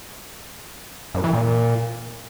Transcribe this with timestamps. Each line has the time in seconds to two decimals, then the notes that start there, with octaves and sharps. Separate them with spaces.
1.15 F#2
1.24 E3
1.33 A#2